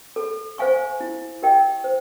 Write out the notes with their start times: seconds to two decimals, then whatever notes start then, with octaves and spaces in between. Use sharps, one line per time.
0.16 A4
0.58 C5 F5 G#5 C#6
1.01 E4
1.42 G4 A#4 D#5 G5
1.84 C5